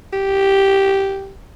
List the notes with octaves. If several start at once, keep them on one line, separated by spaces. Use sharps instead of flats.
G4